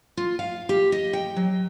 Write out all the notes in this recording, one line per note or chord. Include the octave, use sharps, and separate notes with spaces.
F4
F5
G4
D#5
G5
F#3